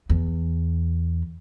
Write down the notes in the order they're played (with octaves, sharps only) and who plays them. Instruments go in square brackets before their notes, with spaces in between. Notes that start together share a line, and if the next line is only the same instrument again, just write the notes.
[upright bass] E2